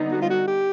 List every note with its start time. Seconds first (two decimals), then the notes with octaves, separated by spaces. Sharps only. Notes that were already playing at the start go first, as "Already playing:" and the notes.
Already playing: D3 G3 B3 D#4
0.12 F#4
0.22 F4
0.30 F#4
0.47 G4